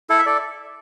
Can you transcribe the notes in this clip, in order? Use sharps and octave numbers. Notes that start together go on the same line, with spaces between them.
E4 A4
E5
A4 D5